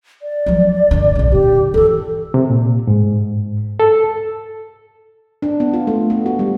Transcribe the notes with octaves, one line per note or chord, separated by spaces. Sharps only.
D5
F3 F#3
G2 D3
A#1 C#3
A#2 D3 G4
E3 F4 A4
C3
A#2
G#2
A4
D4
B3
F4
A3
B3
F#4
G3